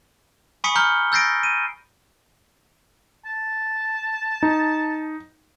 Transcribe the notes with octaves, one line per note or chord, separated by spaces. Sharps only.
G#5 B5 C#6 D#6 B6 C#7
A#5 F6 G6 C#7 G7
E6 G6 A6 A#6 C7 D7
D#7
A5
D#4